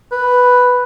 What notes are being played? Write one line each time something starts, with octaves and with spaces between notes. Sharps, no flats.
B4